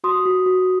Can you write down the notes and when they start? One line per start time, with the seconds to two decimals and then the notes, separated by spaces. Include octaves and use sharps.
0.04 F#4 C6 D#6
0.26 F#4
0.46 F#4